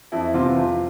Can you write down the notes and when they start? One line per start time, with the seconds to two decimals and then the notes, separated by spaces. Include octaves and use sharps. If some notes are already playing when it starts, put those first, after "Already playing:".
0.12 F2 E4
0.34 C3 E3 F4
0.56 F2